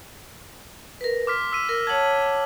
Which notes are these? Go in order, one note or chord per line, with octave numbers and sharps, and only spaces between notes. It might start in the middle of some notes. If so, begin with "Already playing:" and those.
A#4 B4
C6 D6 F6 B6
E6 B6 D#7
A#4
C#5 F#5 A5 G#6 F#7